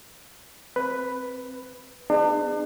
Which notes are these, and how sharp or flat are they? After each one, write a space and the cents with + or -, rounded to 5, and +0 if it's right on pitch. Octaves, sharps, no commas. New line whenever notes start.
C4 +0 B4 +5
B3 +45 D4 +40 G#4 -25